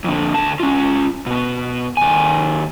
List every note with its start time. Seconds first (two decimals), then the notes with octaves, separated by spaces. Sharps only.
0.04 F2 D3
0.34 D2 A5
0.60 C#4 F4
1.26 B2 B3
1.97 D#2 G#5